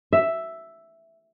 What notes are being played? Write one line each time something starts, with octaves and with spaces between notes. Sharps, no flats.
E5